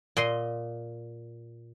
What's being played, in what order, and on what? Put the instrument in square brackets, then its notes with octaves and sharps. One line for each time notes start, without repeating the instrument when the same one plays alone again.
[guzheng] A#2 D#5 C6